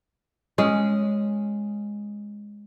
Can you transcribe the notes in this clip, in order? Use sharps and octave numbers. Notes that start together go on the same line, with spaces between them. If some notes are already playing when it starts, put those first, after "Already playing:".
G#3 C#4